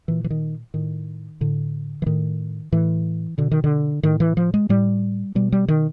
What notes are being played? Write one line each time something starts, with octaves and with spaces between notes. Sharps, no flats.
A#2 E3
E3
D#3
A2 D#3
A2 D3
E3
A2 D#3
A2 E3
B2 D3
D#3
D3
A2 D#3
E3
F3
G#3
A2 G3
B2 G3
G3
D#3